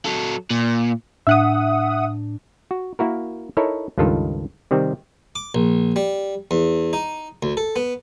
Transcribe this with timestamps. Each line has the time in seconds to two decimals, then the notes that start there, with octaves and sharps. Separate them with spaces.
0.06 F#3 A4
0.51 A#2
1.27 A2 D4 E5 F#5 D#6
2.71 F#4
2.99 A#3 E4 F#4 A#4
3.57 D#4 E4 A4 A#4 C#5
3.98 C#2 G2 D#3 F4 A4
4.71 C3 D#3 G3 C4
5.36 D6
5.55 A#1
5.96 G3
6.51 E2
6.93 D#4
7.43 D2
7.57 A4
7.76 B3